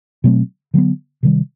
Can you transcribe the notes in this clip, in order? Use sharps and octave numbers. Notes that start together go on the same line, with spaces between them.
B2 F#3 A3 C4
D3 F#3 B3
C3 D#3 G3